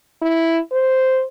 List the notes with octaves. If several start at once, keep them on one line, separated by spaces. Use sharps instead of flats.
E4
C5